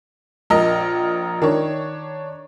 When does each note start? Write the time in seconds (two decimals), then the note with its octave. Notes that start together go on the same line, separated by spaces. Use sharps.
0.50 A#1 A#4 D#5
1.42 D#3 D4 C#5